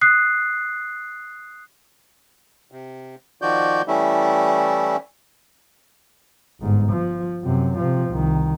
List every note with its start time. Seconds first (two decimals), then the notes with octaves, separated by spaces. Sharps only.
0.01 D#6 F#6 C7
2.72 C3
3.42 D#3 F3 F#4 D5 G6
3.88 E3 G3 A3 C#4 E4 E5
6.61 G1 G#2
6.92 F3
7.44 F#2 C3
7.78 C3 F3
8.09 C2 D#3